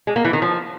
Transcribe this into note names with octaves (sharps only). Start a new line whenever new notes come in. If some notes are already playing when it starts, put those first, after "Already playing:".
G#3
A#3
E3
D#3
F3